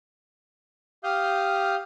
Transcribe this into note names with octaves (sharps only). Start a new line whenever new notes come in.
G4 F5 D#6 F6 G6